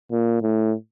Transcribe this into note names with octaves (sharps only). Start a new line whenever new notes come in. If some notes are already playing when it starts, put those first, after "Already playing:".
A#2
A2